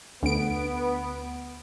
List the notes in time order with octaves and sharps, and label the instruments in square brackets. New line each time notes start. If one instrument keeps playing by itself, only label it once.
[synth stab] D2 D7 [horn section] B3